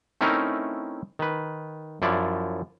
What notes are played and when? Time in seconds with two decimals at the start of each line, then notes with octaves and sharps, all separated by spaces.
0.21 A3 C4 C#4 D#4 E4 A#4
1.19 D#3 B4
2.02 F#2 F3 E4 D5